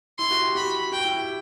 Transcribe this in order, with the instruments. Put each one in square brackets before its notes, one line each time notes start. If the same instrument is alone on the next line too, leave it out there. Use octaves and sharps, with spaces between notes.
[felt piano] E4 [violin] C6
[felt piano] F#4
G4
[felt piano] F#4 [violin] B5
[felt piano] F#4 [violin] G5
[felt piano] E4
G4